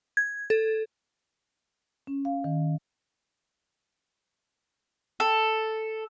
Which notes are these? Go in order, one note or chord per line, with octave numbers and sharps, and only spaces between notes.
G#6
A4
C#4
F5
D#3
A4